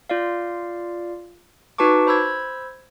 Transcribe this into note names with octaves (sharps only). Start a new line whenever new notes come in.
F4 D5 F5
D#4 F#4 B4 A5 C#6 D6
C5 B5 E6 G#6